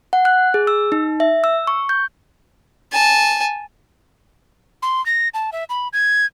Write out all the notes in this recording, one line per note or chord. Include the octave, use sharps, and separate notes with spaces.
F#5
F#6
G#4
E6
D#4
E5
E6
C#6
G6
G#5 A5
C6
A#6
A5
E5
B5
G#6